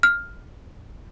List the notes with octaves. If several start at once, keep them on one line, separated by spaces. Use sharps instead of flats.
F6